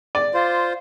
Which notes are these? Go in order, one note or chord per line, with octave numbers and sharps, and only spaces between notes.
D5
F4 C5